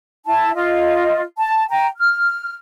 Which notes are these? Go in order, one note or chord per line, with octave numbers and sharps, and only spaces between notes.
E4 A5
F4 D#5
A5
G5 A#5
F6